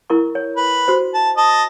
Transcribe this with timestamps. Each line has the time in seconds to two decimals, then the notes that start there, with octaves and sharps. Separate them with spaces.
0.10 E4 A#4 C#6
0.35 C#5
0.56 B4
0.88 F#4 C5
1.14 A5
1.37 D#5 A5